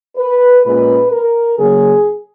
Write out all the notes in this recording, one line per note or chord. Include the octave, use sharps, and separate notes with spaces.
B4
A#2 G#3 C#4 B4
A#4
C#3 F#3 A#3 G#4